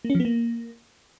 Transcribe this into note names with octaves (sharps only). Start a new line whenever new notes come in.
A#3
C#4
F3
B3
A#3